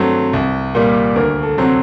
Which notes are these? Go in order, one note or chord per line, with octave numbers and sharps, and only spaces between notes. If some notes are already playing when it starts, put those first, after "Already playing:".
Already playing: G2 F#3 A3 C4
C2
A#2 G3 A#3
D2 A#4
A4
C3 F#3 C4 F#4